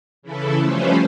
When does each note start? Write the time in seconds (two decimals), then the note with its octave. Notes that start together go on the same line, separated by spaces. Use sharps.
0.22 C#3 E3 E4 A4
0.59 F3 G3 A3 C#4 B4 C5